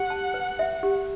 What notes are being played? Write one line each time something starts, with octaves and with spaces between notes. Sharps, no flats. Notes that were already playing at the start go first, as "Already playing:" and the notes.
Already playing: G4 F#5
A5
B4
E5
G4